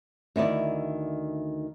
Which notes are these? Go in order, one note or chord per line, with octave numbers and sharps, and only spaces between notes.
D2 D#3 E4 D5